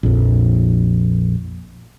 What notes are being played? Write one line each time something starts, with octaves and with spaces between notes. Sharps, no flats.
A#1 F2